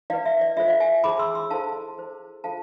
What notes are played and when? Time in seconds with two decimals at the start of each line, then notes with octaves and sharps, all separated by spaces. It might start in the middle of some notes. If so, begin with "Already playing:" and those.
0.10 E4 B4 D5 F5
0.26 E5
0.41 D5
0.57 F4 A4 C5 E5
0.68 D5 F5
0.80 E5 G#5
1.04 E4 G#4 C5 B5 D6
1.19 C6 E6
1.35 C6 E6
1.50 E4 A4 C5 F5 A5
1.98 E4 G#4 C5
2.44 F4 A4 C5 F5 A5